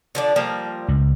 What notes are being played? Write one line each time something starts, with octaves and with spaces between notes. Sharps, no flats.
D3 F3 D5
F3 G3 A#3
C#2